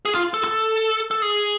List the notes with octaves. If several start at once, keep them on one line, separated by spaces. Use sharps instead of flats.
G#4
F4
A4
A4
A4
G#4